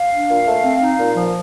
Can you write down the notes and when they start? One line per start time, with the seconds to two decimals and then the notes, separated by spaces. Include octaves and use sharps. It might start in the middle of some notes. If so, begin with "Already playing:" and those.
Already playing: F5
0.11 D4
0.29 A#2
0.46 A3
0.63 C4
0.81 D#4
0.98 A#2
1.16 F3